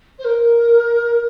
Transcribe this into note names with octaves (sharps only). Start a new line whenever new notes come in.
C5
A#4